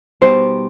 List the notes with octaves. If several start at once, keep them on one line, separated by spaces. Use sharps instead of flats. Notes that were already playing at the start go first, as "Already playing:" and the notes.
B2 G3 B3 D#4 G4 C5